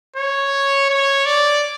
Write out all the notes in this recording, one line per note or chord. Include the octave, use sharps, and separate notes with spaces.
C#5
C#5
D5